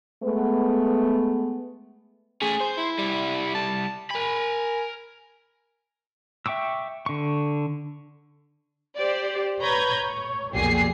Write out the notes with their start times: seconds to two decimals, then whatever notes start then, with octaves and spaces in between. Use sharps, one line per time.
0.24 G#3 A3 B3
2.42 A3 C#4 G#4
2.60 C5
2.78 E4
2.98 C2 G3
3.55 A5
4.10 A#4 G#5 B5
6.46 E5 G5 C#6 D6 E6
7.06 D3 C#6
8.97 G4 C5 D5
9.60 B4 C#5 A#5 B5 G6 G#6
10.03 C#5
10.54 B1 F2 A#2 G4 G#4 C7